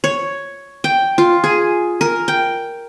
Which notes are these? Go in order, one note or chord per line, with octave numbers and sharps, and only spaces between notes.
C#5
G5
F4
G#4
A#4
G5